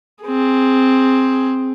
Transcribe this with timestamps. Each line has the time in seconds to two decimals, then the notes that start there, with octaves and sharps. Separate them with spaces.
0.23 C4 G#4